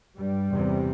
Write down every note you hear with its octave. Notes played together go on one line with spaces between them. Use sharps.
G2 G3
E2 C3